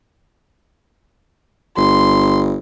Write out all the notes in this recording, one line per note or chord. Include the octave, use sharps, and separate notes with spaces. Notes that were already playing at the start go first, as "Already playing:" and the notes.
G1 C6